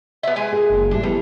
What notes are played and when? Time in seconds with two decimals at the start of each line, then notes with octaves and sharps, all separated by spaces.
0.23 B3 E5
0.36 G#3 G#5
0.52 F4 G#4 A#4
0.70 F#1
0.91 A2 G3 D4
1.03 E3 G3 B3